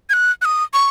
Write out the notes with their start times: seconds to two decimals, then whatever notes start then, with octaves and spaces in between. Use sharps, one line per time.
0.10 G#6
0.13 F#6
0.42 F#6
0.45 D#6
0.74 C#6